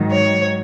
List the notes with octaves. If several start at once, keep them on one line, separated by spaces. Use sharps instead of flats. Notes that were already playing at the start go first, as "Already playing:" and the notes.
Already playing: G#2 D#3 F#3
C#5